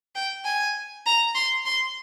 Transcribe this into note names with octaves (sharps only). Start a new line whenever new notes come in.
G5
G#5
A#5
C6
C6